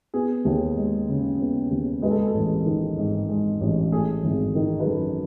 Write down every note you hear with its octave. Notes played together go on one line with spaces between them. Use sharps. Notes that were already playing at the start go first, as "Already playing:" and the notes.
B3 G#4
D#2
G#3
C#3
B3
D#2
G#3 B4
A4
G#4
A4
A1
D#3
G#2
G#3
A1
A3 G#4
G#1
D#3
B4
F#2 A4